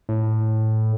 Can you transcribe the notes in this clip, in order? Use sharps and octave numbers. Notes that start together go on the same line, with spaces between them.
A2